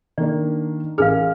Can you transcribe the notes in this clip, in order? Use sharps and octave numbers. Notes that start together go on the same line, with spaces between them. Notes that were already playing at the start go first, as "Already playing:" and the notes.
D#3 A#3 D4 D5
A1 G#4 A#4 F5 G#5 F6